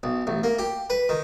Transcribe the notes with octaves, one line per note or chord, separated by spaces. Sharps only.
B1
A1
A#3
G4
B4
D#3